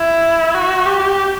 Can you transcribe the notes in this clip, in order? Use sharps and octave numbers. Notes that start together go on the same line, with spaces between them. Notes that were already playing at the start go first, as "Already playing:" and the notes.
Already playing: E4
F#4
G4